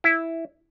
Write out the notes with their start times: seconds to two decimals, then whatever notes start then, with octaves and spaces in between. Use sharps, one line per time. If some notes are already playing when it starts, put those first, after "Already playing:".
0.04 E4